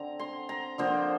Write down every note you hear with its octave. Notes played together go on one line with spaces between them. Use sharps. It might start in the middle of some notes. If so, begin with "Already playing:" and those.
Already playing: D3 C4 A#5
C6
A#5
D3 F3 A#3 C5